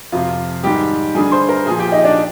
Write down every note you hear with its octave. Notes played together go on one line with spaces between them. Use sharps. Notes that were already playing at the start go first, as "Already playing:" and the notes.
F2 C3 F3 F4 F5
G#2 D#3 G3 G4 G5
G2 D3 G3 G#4 G#5
C5 C6
A#4 A#5
A#2 F3 G#4 G#5
G4 G5
D#4 D#5
D4 D5